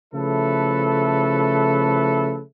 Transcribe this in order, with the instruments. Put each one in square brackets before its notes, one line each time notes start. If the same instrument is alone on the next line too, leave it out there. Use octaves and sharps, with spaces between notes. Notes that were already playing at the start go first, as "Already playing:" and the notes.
[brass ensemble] C#3 F3 A3 E4 A4 B4